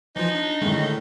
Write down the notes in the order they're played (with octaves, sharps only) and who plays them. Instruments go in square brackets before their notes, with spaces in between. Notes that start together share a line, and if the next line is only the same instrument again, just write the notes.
[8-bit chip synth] E3 F3 F4 [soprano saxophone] D#4
[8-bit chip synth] D4
[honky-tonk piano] A2 D3 G#3 [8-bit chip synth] D#3 A3